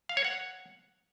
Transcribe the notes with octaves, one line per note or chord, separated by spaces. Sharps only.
F5
C#5
F#5